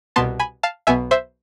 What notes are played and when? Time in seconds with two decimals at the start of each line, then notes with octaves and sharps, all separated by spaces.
0.16 C2 B2 B3 A5 C6
0.40 G#5 B5
0.63 F5 A5
0.87 B1 B2 B3 E5 G#5
1.11 C5 E5